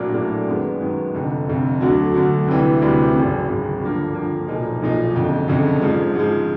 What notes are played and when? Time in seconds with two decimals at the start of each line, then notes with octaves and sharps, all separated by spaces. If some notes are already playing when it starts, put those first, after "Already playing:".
Already playing: A#1 A2 F#3 A#3 D4
0.14 A#1 A2 F#3 A#3 D4
0.47 F#2 D#3 G#3 B3
0.80 F#2 D#3 G#3 B3
1.14 F1 F2 D3
1.47 F1 F2 D3
1.81 D2 D3 F#3
2.14 D2 D3 F#3
2.48 D2 C3 E3 G3
2.82 D2 C3 E3 G3
3.14 G#1 F#2 C#3
3.48 G#1 F#2 C#3
3.81 G2 D3 F3 A#3
4.14 G2 D3 F3 A#3
4.48 B1 A#2 F3 A#3 D#4
4.82 B1 A#2 F3 A#3 D#4
5.15 F#1 F2 D3
5.48 F#1 F2 D3
5.81 G#2 F3 G#3
6.15 G#2 F3 G#3